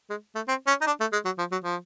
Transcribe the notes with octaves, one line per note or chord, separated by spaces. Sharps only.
G#3
A3
C4
C#4
D#4
D4
A3
G#3
F#3
F3
F#3
F3